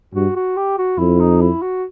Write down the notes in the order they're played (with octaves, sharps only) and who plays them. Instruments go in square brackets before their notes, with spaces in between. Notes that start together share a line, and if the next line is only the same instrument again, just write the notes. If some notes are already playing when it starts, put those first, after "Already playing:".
[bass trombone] G2 [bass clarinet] F#4
[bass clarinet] F#4
G4
F#4
[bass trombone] F2 [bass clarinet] E4
[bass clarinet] D#4
E4
F#4